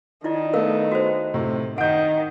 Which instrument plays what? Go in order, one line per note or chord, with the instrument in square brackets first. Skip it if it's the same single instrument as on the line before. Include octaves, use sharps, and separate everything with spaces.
[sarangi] D#3 [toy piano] E4 F4 D5
[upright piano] A3 B3 [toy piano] A#4 F5
[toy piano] F#4 C5
[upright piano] A2 C3 C4
[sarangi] D#3 [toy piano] F#5 [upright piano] G6 D7